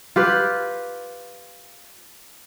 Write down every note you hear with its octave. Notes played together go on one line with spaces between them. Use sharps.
F4 G4 B4